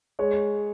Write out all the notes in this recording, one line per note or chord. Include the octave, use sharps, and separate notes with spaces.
G#3 C#5